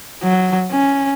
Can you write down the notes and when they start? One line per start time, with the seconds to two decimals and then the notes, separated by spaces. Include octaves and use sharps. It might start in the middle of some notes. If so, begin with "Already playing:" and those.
0.23 F#3
0.71 C#4